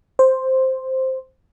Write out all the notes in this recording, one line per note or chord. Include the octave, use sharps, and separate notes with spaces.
C5